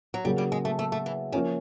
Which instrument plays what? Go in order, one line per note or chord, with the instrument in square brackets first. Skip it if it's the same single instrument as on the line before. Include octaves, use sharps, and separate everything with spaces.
[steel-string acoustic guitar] F#3
[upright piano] C#3 F#3 A#3 [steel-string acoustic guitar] G3
[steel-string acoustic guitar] G3
G#3
A3
A3
A3
E3
[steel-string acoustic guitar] D#3 [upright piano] F3 A#3 C#4